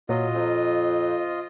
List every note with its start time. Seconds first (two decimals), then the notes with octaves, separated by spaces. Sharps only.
0.09 A#2 F#3 F4 D#5
0.34 F2